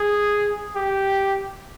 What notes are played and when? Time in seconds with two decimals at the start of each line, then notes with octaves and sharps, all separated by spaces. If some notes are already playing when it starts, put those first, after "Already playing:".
Already playing: G#4
0.76 G4